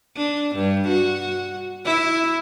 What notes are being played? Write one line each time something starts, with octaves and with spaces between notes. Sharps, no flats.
D4
G2
F#4
E4